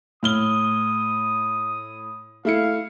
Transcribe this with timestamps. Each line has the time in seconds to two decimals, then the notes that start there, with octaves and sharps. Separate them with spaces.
0.23 A2 D#6 F6 G7
2.45 A3 E4 F5 C#7